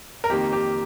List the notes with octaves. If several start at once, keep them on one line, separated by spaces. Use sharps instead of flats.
A#4
F2 D#3 A#3 G4
G4